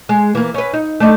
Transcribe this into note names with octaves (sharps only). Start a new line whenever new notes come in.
G#3
E3 A#3
C#4 B4
D#4
A3 D4 D#4